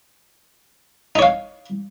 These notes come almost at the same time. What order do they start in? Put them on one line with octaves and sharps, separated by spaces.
D#4 C#5 F5